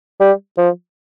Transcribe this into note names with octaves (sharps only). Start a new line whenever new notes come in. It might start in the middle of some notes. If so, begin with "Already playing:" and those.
G3
F3